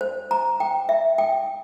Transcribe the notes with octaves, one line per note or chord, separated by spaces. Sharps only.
C5
A#5
G5
E5
G5